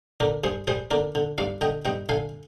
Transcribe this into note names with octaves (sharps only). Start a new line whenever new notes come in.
D3 A#4 D5
G2 G#4 C5
G3 G#4 C5
D3 A#4 D5
D3
G2 D5 F5
D3 D#5 G5
G2 D#5 G5
D3 F5 G#5